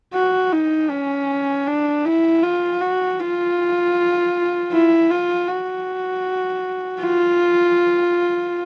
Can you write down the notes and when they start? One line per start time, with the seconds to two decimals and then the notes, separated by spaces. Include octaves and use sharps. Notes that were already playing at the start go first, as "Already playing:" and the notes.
0.14 F#4
0.52 D#4
0.90 C#4
1.67 D4
2.05 E4
2.43 F4
2.81 F#4
3.20 F4
4.72 E4
5.10 F4
5.48 F#4
7.01 F4